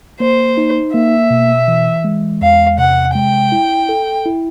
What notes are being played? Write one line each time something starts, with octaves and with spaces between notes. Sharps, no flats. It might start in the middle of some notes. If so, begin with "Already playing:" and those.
A#3 C5
D#4
A#3 E5
B2
E3
G#3
E2 F5
C3 F#5
G#3 G5
E4
A4
E4